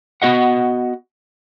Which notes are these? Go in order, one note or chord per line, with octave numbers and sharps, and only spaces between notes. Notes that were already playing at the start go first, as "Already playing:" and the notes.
B3 F#4 D#5 F#5